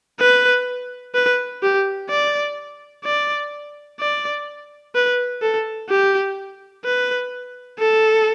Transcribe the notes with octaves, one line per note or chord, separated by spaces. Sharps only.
B4
B4
G4
D5
D5
D5
B4
A4
G4
B4
A4